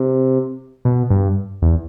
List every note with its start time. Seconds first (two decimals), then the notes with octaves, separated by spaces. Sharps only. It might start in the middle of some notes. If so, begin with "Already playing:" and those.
Already playing: C3
0.85 B2
1.10 G2
1.62 E2